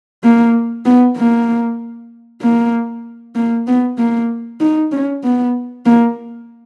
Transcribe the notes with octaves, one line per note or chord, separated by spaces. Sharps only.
A#3
B3
A#3
A#3
A#3
B3
A#3
D#4
C#4
B3
A#3